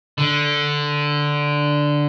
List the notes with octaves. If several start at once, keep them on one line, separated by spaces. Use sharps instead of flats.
D3